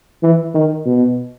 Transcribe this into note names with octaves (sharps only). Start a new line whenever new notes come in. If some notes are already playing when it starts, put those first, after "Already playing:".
E3
D#3
B2